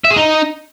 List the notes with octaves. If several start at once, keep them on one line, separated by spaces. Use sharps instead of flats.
E5
G#4
D#4